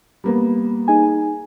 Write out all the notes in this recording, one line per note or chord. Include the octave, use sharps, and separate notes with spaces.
G3 A#3 B3
D#4 G#4 G#5